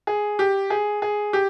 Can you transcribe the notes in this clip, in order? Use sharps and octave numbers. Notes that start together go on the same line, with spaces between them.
G#4
G4
G#4
G#4
G4